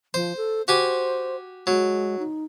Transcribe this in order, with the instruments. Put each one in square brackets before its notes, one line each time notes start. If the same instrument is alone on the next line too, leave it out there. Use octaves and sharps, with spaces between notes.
[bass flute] F3 [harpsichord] C5
[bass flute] A4
[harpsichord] F#4 G4 G#5 [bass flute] C5
[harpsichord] F#3 [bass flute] G#3
[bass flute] D#4